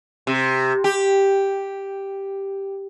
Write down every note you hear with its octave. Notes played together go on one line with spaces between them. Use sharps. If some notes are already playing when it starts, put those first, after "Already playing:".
C3
G4